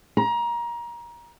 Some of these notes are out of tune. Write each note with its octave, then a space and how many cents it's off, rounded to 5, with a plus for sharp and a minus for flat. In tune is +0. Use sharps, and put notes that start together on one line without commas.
A#5 +25